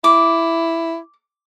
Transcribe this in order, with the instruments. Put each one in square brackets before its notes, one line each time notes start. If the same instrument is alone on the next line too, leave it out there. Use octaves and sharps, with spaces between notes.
[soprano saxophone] E4 [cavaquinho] D6